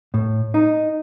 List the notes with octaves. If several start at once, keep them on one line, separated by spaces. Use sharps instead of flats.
A2
D#4